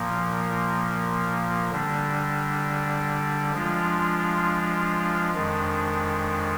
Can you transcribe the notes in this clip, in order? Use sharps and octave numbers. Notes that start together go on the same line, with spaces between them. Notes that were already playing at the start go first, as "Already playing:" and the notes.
Already playing: A#2 F3 A#3
D3 G3 D4
F3 G#3 D4 F4
F2 D#3 G#3 D4